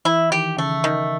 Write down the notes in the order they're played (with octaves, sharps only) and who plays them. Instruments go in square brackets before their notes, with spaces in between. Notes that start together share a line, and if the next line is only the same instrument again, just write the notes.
[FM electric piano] E3 [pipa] E4
[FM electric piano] D#3 [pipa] G4
[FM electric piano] C#3 [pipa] A3
[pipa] D#3